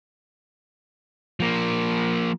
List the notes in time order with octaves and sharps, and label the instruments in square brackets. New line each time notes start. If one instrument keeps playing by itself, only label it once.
[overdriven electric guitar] F3 A#3